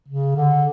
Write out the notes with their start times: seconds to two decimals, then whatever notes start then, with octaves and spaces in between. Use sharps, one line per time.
0.08 C#3
0.36 D3